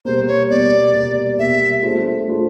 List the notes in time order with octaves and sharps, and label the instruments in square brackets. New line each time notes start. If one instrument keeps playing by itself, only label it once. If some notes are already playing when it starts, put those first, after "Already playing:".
[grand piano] B2 G3 A#3 [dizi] C5
[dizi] C#5
[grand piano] B2 G3 A#3 [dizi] D5
[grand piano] B2 G3 A#3
[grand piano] B2 G3 A#3 [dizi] E5
[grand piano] A3 D4 F4 G#4 C5
A3 D4 F4 G#4 C5